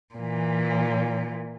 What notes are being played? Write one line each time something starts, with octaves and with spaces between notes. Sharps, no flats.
A#2 E3